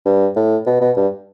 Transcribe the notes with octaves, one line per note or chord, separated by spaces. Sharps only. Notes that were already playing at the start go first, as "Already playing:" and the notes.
G2
A2
B2
B2
G2